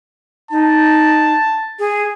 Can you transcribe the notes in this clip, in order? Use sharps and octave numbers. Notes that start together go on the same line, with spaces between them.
D#4 A5
G#4